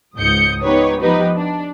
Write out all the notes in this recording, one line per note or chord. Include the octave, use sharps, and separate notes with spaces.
C#2 G#2 D#6 G6 C#7
B3 D#4 G4 B4 C#5
F3 B3 D#4 G4 B4
D4